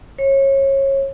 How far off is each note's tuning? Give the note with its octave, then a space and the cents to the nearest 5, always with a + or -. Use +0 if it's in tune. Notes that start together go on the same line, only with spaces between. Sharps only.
C#5 -25